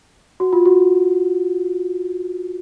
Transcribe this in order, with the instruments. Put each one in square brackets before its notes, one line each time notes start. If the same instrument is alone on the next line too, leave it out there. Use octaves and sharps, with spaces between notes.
[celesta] F#4
F4
F#4